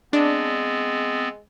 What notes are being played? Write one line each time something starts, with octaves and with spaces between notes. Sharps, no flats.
G#3 B3 C4 D4